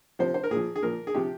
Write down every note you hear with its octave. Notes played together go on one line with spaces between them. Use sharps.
C3 F3 C5
C5
A#4
A#2 G#4
F3
G#4
A#2 F3 A#4
G#4
C3 F3 G4